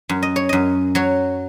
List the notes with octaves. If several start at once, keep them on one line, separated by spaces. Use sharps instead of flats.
F#2
D#5
C#5
F#2 D#5
F#3 C#5